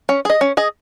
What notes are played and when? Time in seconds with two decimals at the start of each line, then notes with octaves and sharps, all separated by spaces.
0.09 C#4
0.25 G#4 D#5
0.41 C#4
0.57 G#4 D#5